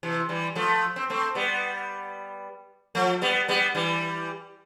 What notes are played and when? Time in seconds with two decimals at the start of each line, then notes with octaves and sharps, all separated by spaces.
0.03 C3 E3
0.29 E3 G3
0.55 F3 A3
0.96 C4
1.10 A3 C4
1.35 G3 B3
2.95 F3 A3
3.22 G3 B3
3.48 G3 B3
3.75 E3 G3